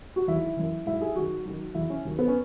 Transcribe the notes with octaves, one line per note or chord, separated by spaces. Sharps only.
F#4
E2 D#3 F#3 E4
F#2 E3
G#2 F#3 E4
G#4
F#2 D#3 F#3 F#4
F#2 D#3 F#3
E2 D#3 F#3 E4
C#4
D#2 D#3 F#3
B3
C#4